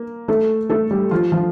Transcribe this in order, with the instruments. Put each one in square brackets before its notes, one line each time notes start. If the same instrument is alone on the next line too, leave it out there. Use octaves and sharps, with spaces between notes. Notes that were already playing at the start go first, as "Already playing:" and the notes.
Already playing: [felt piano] A#3
A3 A4
A3 A4
G3 G4
F3 F4
F3 F4